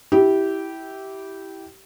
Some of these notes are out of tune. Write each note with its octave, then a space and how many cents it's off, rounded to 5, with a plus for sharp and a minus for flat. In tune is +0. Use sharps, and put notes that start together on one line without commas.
E4 -10 G4 -15